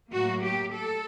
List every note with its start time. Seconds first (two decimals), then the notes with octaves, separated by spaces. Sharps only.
0.13 A2 F#3 A#3 F#4
0.43 G4
0.74 A4